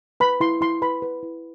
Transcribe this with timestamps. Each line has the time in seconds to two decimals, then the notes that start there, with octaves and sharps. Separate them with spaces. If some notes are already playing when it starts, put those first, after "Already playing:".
0.20 B4 B5
0.40 E4 C6
0.61 E4 C6
0.82 B4 B5
1.02 B4
1.23 E4